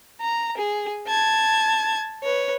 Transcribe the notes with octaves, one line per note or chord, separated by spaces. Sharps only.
A#5
G#4
A5 G#6
B4 C#5